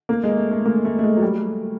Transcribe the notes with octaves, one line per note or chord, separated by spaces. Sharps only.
A#3
G#3
A3
A3
A#3
A3
A3
G#3
F#3
G3